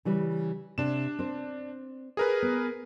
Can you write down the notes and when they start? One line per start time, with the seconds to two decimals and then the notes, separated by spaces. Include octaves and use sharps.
0.05 C#3 E3 G3
0.78 C3 D4 E7
1.19 C4 C5
2.17 G#4 A#4 B4
2.42 B3